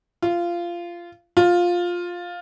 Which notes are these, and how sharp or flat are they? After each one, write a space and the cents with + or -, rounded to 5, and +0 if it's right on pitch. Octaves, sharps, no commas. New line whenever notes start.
F4 -15
F4 +10